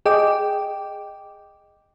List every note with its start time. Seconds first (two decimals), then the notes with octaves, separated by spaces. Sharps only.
0.06 G#4 D#5 G5 D6